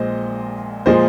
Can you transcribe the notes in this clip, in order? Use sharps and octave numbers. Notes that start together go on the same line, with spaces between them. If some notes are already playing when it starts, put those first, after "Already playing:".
Already playing: A#1 A#2 G#3 C5 D#5
A#2 F3 G#3 C5 D#5